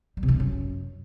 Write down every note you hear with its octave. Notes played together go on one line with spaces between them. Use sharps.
G3
C3
E3
D3
F#2